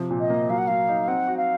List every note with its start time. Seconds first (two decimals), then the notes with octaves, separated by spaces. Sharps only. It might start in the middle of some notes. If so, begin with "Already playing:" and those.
Already playing: C3 F3
0.10 A#2
0.20 D#5
0.30 A#3
0.49 F#3 F5
0.58 F#5
0.68 F#3 F5
0.89 D#4
1.08 C4 F#5
1.28 F#4
1.37 F5